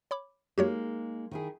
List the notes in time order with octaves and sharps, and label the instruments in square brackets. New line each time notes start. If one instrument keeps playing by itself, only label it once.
[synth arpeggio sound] C#5 B5 D6
[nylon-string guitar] G#3 A#3 D#4 [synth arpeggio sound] F#4 G4 C#5
[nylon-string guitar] D#3 E4 G#4